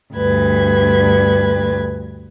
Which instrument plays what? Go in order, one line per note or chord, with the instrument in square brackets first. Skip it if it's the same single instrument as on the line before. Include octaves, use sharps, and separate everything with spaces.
[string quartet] D2 G2 B4 G#6